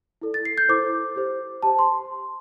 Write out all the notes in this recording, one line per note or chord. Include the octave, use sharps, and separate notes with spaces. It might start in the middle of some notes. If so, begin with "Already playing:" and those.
E4 A4 D5
A6
C7
G6
E4 A4 C5 D6
G4 C5
G4 C5 A5
C6